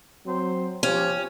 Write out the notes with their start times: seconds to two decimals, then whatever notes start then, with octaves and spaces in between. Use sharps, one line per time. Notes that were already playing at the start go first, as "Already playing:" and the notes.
0.25 F#3 C4 C5
0.83 F3 C#4 G4